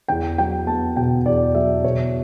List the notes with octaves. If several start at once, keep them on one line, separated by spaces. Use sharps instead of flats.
E2 G5
F#3 G5
B3 A5
B2 G5
E2 D5
F#3 E5
B2 C#5